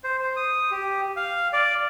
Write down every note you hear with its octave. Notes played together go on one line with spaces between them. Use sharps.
C5
C5
D#6
G4
F5
D5